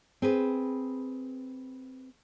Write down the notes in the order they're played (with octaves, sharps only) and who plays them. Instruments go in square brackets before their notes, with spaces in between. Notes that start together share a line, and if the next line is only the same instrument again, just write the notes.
[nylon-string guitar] C4 G#4 B4